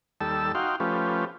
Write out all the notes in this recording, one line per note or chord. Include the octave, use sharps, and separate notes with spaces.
D#2 G3 A4 A5 E6
D#4 F#4 F5 G5 C6
F3 A3 C#4 F4 G4 B4